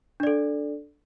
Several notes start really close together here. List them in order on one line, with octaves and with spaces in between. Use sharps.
D4 D5 A4